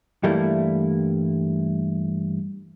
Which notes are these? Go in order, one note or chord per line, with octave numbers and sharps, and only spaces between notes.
G2 E3 G3 A3 A#3 E4